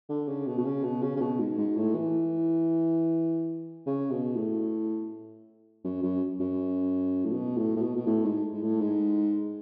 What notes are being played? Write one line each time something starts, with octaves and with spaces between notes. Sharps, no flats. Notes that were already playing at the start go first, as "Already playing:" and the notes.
D3
C#3
B2
B2
C#3
B2
C#3
C#3
B2
G#2
G#2
A2
E3
C#3
B2
A2
F#2
F#2
F#2
A2
B2
A2
A2
B2
B2
A2
G#2
G#2
A2
G#2